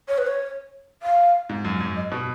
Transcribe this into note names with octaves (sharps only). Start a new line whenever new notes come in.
C#5
B4
C#5
F5
G#2
F#2
F#2
D#5
B2